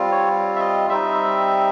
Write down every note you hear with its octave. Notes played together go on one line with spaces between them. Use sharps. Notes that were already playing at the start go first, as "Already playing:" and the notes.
Already playing: G3 C4 F4
C#5
E5
D#5
G3 C4 D#4 E5